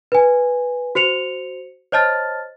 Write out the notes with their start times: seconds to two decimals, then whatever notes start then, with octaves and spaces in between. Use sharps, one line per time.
0.12 B4 G#5
0.95 F#4 C5 C#7 F7
1.92 C5 C#5 D#5 A5 F6 A6